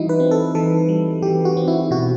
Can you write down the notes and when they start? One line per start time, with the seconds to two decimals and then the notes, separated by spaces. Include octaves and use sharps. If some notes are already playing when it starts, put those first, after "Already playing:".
Already playing: E3 G3 D#4 E4 F#4
0.09 B4
0.20 C4
0.31 A4
0.55 E3 A4
0.89 G3
1.22 E3 G4
1.45 F#4
1.57 C4
1.68 E4
1.91 B2 F#4